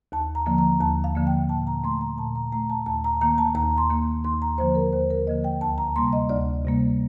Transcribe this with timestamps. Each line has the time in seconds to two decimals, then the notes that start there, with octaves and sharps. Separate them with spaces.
0.12 D#2 A5
0.35 A#5
0.46 D3 F3 A#3
0.58 A#5
0.80 D#2 A5
1.04 F5
1.15 D3 F3 A#3
1.27 G5
1.49 A#2 A5
1.67 A#5
1.84 A3 C6
2.01 A#5
2.18 A#2 A5
2.35 A#5
2.53 A3 A#5
2.70 A5
2.86 D#2 A5
3.04 A#5
3.21 D#3 A#3 A#5
3.38 A5
3.55 D#2 A#5
3.78 C6
3.90 D#3 A#3
4.24 D#2 C6
4.42 A#5
4.58 D3 F3 A#3 C5
4.75 A#4
4.93 D#2 C5
5.10 A#4
5.27 D3 F3 A#3 D#5
5.44 G5
5.61 D2 A5
5.78 A#5
5.96 C3 G3 A#3 C6
6.13 D#5
6.29 D2 D5
6.65 C3 G3 A#3